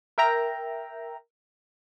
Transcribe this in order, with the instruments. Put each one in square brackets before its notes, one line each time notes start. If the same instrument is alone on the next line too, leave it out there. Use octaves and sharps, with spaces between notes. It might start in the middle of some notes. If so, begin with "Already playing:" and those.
[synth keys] A#4 E5 G5 A#5